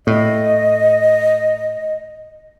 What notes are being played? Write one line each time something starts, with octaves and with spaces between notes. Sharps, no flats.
A2 D#5